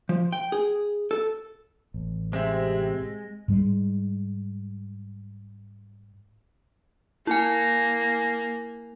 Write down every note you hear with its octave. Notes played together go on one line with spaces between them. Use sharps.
F3
G5
G#4
A4
A1
C3 G#3 C4 E5
G#2 G3 G#3
A#3 E4 G#5